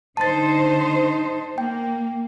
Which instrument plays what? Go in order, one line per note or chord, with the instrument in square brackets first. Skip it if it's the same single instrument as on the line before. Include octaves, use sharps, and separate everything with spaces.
[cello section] D3 D#4 C5 [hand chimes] A5 A6
[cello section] A#3 [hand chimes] G5